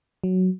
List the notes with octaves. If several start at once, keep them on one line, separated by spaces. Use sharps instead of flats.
F#3